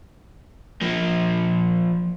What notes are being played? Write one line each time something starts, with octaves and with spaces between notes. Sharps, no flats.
F3 A#3